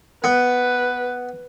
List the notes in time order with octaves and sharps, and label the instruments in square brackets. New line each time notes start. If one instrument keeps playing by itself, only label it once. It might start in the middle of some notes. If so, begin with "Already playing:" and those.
[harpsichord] B3 [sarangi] B4